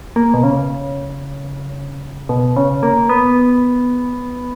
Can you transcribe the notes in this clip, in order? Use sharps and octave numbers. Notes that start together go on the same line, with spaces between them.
A#3
B2
C#3
B2
C#3
A#3
B3